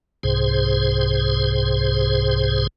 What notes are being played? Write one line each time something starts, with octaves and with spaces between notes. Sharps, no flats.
C2 G#2 C3 G#4 C5